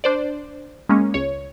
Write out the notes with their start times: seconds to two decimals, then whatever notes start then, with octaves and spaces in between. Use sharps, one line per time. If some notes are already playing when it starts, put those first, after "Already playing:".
0.04 D4 C5 D5
0.89 G#3 A#3 C#4
1.14 C#2 C#5